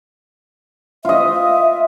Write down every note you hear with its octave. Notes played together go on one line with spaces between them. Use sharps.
F4 D#5 E5